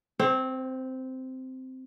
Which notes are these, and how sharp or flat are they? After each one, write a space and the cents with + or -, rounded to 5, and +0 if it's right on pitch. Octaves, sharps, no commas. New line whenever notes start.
C4 -10 C5 +40